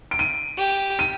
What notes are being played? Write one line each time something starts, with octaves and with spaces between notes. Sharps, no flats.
D7
D#7
G4
D#7